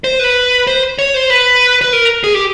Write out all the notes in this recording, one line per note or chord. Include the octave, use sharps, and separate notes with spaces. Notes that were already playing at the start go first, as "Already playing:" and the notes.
C5
B4
C5
C#5
C5
B4
B4
A#4
G#4
G4